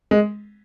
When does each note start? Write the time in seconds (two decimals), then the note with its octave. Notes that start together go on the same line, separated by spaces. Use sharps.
0.11 G#3